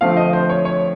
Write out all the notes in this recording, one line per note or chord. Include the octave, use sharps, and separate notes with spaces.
D3 F3 A3 C4 F5
D#5
C5
C#5
C#5